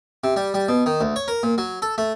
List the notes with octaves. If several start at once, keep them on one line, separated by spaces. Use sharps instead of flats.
C3
G3
G3
B2
D#3
D2
C#5
A#4
A#2
F#3
A4
A3